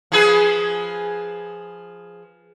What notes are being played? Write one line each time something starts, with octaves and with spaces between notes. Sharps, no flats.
F3 G#4 B4